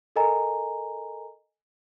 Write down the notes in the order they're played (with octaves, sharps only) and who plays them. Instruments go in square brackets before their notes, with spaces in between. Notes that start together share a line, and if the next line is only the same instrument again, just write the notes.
[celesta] A4 A#4 D#5 G#5 A#5